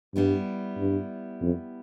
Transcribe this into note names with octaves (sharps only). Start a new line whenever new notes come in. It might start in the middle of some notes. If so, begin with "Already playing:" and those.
G2 G3 B3 E4
G2
F2